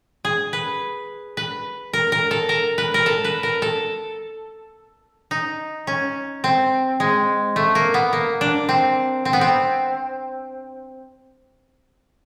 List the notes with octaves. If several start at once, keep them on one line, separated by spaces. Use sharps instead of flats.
G#4
B4
B4
A#4
A#4
A4
A#4
B4
A#4
A4
B4
A#4
A4
D#4
C#4
C4
G#3
A3
A#3
B3
A#3
D4
C4
C4
B3
C4